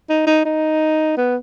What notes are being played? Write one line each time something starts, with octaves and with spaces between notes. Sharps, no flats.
D#4
D#4
D#4
B3